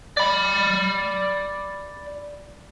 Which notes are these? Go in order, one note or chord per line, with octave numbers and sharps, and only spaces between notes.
D5 B5